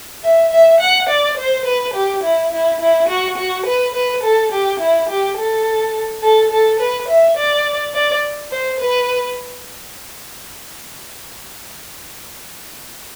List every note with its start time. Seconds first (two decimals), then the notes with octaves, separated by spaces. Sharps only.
0.23 E5
0.52 E5
0.81 F#5
1.09 D5
1.38 C5
1.66 B4
1.94 G4
2.24 E4
2.52 E4
2.81 E4
3.09 F#4
3.38 F#4
3.66 B4
3.94 B4
4.24 A4
4.52 G4
4.80 E4
5.09 G4
5.37 A4
6.23 A4
6.52 A4
6.80 B4
7.09 E5
7.37 D5
7.94 D5
8.52 C5
8.80 B4